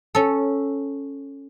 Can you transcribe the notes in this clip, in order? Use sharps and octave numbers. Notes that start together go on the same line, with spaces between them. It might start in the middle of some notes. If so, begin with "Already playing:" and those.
C#4 A4